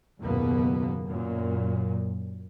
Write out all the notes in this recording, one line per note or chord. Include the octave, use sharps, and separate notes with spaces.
F#1 D#2 B2 A#3 B3
F#2 A#2